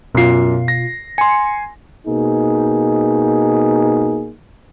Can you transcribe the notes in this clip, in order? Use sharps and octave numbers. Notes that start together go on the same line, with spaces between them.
F#2 B2 F4 C7
A#6
G#5 C6 C#7
B2 A#3 D#4 G#4